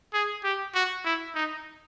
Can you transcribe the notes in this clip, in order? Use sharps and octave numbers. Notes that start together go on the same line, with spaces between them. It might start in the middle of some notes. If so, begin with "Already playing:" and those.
G#4
G4
F#4
E4
D#4